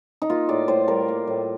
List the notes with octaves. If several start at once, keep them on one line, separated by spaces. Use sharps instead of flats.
D#4
A#3 F4
A2 D5
A2 C5
G3 A#4
A#3
A2